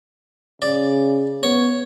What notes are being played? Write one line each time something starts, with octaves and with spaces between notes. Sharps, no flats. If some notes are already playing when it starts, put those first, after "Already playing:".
C#3 D5
B3 C#5